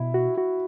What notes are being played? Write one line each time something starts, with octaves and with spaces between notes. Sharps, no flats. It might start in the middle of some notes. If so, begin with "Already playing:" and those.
Already playing: B2 E4
F#4
F#4